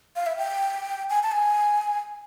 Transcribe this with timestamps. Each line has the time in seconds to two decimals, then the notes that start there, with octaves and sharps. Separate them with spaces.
0.16 F5
0.26 E5
0.37 G5
1.10 G#5
1.23 A5
1.32 G#5